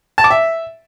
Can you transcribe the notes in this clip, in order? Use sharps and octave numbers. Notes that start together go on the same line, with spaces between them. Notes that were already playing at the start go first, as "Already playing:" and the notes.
A5
D6
E5